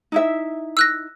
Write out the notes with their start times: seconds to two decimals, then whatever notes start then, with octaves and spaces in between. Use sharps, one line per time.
0.12 D#4 E4 E5
0.77 E6 F#6 A#6